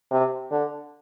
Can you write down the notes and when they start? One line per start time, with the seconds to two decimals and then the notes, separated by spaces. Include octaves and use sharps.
0.11 C3
0.51 D3